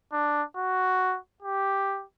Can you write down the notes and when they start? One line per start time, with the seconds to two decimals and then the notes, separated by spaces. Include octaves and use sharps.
0.13 D4
0.56 F#4
1.43 G4